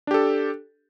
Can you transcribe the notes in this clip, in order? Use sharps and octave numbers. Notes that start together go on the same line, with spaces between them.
D4 G4 A4